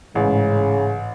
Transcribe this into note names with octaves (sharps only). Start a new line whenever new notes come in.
A1 G#2 C#3